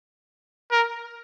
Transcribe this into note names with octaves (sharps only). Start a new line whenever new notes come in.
A#4